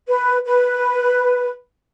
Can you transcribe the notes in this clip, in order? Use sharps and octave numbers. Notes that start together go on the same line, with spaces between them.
B4
B4